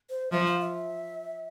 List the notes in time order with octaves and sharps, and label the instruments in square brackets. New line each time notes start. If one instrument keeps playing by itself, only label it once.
[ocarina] C5
[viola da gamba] F3 [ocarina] E5
[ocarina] F5
E5